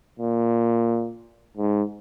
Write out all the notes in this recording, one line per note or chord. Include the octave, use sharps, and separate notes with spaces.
A#2
G#2